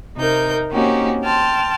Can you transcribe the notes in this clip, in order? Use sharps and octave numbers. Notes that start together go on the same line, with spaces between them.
C3 D#4 A#4 G6
A#3 C4 C#4 D#4 F#4 G4
G5 A5 C6 F6